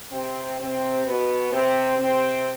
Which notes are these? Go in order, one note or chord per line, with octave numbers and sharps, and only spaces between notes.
C3 C4
C3 C4
B2 B3
C3 C4
C3 C4